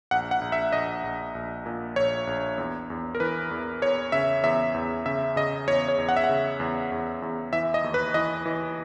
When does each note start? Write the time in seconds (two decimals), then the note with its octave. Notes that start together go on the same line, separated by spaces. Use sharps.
0.11 A#1 F#5
0.31 F#5
0.41 A#1
0.52 E5
0.72 A#1 D#5
1.04 A#1
1.35 A#1
1.66 A#2
1.96 A#1 C#5
2.27 A#1
2.58 E2
2.90 E2
3.15 A#4
3.20 E3 B4
3.51 E2
3.82 E2 C#5
4.12 C#3 E5
4.44 E2 E5
4.74 E2
5.06 C#3 E5
5.36 C#3 D#5
5.67 E2 C#5
5.88 C#5
5.98 E2
6.09 F#5
6.16 E5
6.24 F#5
6.29 C#3
6.60 E2
6.92 E2
7.22 E2
7.53 E3 E5
7.74 D#5
7.84 D#2
7.94 B4
8.14 E3 D#5
8.46 E3